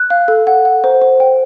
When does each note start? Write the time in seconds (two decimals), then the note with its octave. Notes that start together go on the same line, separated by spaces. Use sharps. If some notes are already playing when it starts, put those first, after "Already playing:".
Already playing: F#6
0.10 F5
0.28 A4
0.47 F#5
0.65 F#5
0.84 C5
1.02 C5
1.20 G5